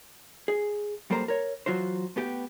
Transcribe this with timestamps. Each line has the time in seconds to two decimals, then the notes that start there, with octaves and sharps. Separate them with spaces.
0.48 G#4
1.10 F#2 G3 A#3 A4 C5 A#5
1.28 A#4 C#5
1.66 E3 F#3 F4 F#4 C5
2.16 A3 B3 G4 G5